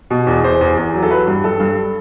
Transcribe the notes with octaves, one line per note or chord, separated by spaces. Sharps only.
B2
E2
E2 C5
E2
E2
F#3
A4
F#3 B4
G2
G2 A4
G2